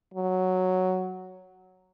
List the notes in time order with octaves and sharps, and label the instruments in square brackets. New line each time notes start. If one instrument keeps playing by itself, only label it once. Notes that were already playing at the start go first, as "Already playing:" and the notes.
[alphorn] F#3